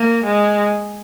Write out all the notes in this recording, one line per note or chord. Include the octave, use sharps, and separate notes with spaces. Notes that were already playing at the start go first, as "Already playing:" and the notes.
Already playing: A#3
G#3